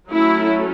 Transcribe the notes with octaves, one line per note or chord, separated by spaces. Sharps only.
F#3 A3 C#4 E4